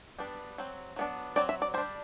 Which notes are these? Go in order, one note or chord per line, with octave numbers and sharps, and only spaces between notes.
G3 B3 D4
F#3 C4
F#3 B3 D4
F#3 C4 D5
E5
D5
G3 D4 C5